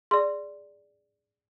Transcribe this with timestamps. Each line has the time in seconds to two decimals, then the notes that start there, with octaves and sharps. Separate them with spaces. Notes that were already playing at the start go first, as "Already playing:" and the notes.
0.11 G#4 D5 C6